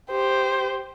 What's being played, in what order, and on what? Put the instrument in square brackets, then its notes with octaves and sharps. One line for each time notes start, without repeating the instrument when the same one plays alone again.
[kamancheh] G4 C5